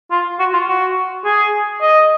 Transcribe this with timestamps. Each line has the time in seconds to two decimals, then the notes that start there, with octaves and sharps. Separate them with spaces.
0.11 F4
0.39 F#4
0.53 F4
0.68 F#4
1.25 G#4
1.82 D#5